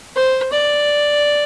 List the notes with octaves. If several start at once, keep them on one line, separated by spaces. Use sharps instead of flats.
C5
D5